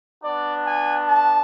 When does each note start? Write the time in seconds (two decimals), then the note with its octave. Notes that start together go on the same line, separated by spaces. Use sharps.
0.23 B3 D4 F#4 D5
0.65 G#5
1.07 A5